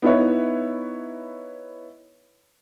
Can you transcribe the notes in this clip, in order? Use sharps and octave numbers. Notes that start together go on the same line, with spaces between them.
B3 D#4 E4 B4 C#5